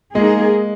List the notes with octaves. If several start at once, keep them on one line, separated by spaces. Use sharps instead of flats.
G#3 A#3 D#4 G#4